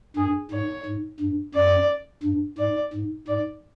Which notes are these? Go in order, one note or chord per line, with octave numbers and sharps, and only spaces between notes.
G2 G#4
G#2 C#5
G#2
G2
F#2 D5
G2
G#2 D5
G#2
G#2 D5